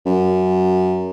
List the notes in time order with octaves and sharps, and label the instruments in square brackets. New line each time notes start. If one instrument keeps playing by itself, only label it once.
[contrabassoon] F#2